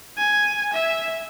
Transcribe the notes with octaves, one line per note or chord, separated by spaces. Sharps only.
G#5
E5